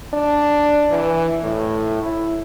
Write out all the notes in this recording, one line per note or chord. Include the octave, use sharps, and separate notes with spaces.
D4
E3
A2
E4